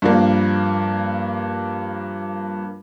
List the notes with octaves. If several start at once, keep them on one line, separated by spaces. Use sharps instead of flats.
G2 F3 A#3